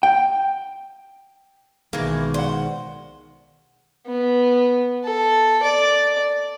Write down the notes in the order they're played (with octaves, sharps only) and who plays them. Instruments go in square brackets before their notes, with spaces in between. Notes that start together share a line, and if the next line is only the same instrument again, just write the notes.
[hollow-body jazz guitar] G5
[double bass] B1 B2 [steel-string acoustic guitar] D#3 G#3 [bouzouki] E3 A#3
[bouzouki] C5 [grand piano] D5 F#5
[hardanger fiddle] B3
A4
D5